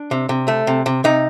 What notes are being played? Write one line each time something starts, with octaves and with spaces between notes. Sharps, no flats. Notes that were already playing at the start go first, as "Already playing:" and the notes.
Already playing: D4
C3
C3
A3
C3
C3
C3 D#4